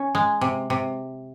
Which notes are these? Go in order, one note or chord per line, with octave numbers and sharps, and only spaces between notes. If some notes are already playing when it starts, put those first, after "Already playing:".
Already playing: C#4
G#3
C3
C3